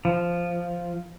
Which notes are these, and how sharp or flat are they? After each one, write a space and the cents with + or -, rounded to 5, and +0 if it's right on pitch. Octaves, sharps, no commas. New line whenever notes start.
F3 -5